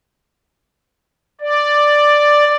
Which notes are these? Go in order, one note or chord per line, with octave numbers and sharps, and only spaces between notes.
D5